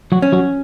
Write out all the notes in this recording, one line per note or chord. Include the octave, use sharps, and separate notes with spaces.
F#3 F#4
C#4
F#3 F#4